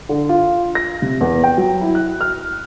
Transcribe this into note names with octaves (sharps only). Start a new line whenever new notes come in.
D3
F4
A#6
C3
E2
G5
F#3
E4
F#6
F6